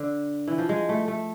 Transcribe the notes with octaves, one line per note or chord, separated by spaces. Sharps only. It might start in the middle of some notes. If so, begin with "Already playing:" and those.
Already playing: D3
E3
F3
G#3
A3
A3